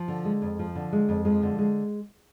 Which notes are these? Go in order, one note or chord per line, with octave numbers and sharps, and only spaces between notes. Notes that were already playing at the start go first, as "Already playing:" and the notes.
Already playing: F3
D3
G#3
F2
F3
D3
G#3
F2
F3 G#3
D3
G#3